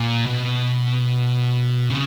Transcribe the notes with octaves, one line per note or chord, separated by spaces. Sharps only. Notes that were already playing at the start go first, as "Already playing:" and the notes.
Already playing: A#2
B2
C#3